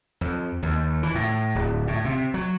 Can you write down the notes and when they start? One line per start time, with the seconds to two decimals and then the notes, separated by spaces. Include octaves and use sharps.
0.21 F2
0.63 D#2
1.03 E3
1.15 A2
1.55 D1
1.87 A2
2.05 C3
2.34 F#3